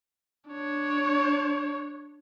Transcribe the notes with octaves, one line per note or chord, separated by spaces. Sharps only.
D4 C#5